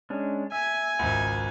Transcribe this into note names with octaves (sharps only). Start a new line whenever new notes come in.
G#3 C#4 D4
E5 G#5
G#1 C#2